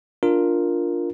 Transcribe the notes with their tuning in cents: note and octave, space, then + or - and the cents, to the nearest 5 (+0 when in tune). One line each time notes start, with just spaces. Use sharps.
D4 +0 F4 +0 A#4 +0